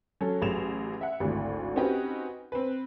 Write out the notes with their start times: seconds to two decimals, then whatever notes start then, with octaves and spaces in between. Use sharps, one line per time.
0.21 F#3 C#4 A4 C#5
0.42 A1 F#3 G#4 E7 F7
1.01 E5 F#5
1.20 G#1 D2 A2
1.76 C4 C#4 D#4 F#4 G4 B4
2.52 C4 B4